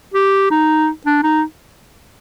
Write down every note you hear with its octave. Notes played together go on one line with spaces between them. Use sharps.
G4
D#4
D4
D#4